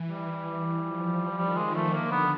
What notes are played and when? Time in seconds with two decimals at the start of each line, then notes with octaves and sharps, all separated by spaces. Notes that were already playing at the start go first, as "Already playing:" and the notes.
Already playing: E3
0.09 G3
0.27 E3
0.83 F3
1.37 D#3 G3
1.57 G#3
1.75 A3
1.94 D3 A#3
2.11 B3